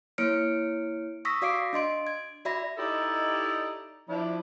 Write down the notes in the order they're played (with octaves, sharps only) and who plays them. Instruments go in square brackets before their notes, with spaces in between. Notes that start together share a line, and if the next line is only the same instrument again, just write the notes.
[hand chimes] A#3 E4 C#5 F6 C#7 D7
C#6 D#6 E6 A#6 B6
F#4 D5 F5 D6 C7 D7
D4 D#5 C6 D7
G#6
F#4 D5 E5 B5 A#6
[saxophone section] D#4 E4 G4 A4 D5 D#5
F3 D4 E4